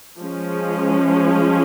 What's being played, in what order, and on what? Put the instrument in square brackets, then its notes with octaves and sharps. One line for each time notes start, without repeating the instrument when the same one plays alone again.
[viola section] F3 G#3 C#4